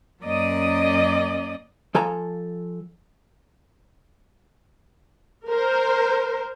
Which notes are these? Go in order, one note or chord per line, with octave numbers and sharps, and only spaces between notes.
F#2 A#3 C#4 D5 D#5 D#6
F3 A4 G#5 A#5
A#4 C5